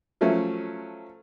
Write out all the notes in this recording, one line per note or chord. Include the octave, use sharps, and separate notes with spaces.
F3 F#3 A3 C#4